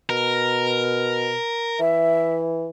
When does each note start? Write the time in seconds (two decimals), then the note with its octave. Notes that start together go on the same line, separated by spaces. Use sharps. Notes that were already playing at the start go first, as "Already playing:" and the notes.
0.09 B2 A#4
1.80 E3 E5